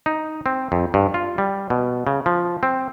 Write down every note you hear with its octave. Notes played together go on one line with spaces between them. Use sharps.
D#4
C4
F2
G2
F4
G3
B2
C#3
F3
C4